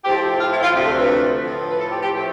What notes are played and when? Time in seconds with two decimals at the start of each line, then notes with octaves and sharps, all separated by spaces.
0.05 A2 F3 C4 G4
0.40 F4
0.51 E4
0.63 F4
0.75 D2 C3 F3 A3 D4 G4
0.86 A4
0.98 B4
1.44 A2 F3 C4
1.70 B4
1.80 A4
1.92 G4
2.03 G4
2.14 A2 F3 A3 C4 G4